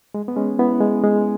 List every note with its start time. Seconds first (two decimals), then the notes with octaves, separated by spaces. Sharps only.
0.14 G#3
0.28 B3
0.36 G#3 C#4
0.59 B3 E4
0.81 G#3
1.04 G#3